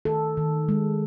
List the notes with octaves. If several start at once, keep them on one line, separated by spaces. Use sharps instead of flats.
D#3 A4
D#3
G#3